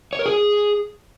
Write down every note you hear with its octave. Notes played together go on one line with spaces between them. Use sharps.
C#5
A#4
G#4